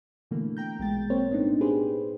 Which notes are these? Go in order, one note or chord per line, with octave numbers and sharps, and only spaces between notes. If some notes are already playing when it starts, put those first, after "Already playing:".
B2 D3 E3 A3 A#3
G5 A#5 G6
A#1 B2 G#3 G5 A6
A#3 C4 A#4 C5 C#5
A2 B3 D4 D#4
G4 G#4 B4 C5